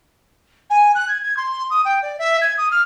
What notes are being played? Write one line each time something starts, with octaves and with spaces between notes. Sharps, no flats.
G#5
F#6
G#6
G#6
C6
D#6
G5
D5
E5
G#6
D#6
F6